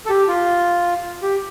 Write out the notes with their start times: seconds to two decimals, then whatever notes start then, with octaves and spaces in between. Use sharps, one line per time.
0.06 A4
0.10 G4
0.28 F4
1.22 G4